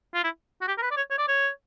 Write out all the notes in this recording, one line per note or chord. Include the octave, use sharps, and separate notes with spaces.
F4
E4
F#4
G4
A#4
B4
D5
C#5
C#5
D5
C#5